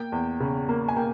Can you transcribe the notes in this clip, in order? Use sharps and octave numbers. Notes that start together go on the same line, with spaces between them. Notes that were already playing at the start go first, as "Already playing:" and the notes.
Already playing: A#3 G5
E2
C#3
A#3
G#5
A#3 G5